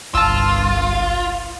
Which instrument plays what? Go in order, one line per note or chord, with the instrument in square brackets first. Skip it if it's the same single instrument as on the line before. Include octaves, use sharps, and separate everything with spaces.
[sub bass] G1 [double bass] C2 G2 [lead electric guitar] F4 [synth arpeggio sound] A5 E6